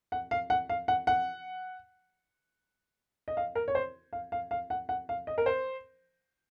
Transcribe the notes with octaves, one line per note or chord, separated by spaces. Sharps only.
F#5
F5
F#5
F5
F#5
F#5
D#5
F5
A#4
C#5
C5
F5
F5
F5
F#5
F#5
F5
D#5
A#4
C5